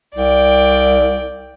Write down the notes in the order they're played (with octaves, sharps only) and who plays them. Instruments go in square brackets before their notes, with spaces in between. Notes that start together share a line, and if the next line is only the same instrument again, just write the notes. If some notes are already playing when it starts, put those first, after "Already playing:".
[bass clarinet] C2 [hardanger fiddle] D5 G5